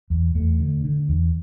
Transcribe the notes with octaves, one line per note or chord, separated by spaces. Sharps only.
E2
E2 A3
D3
D3
E2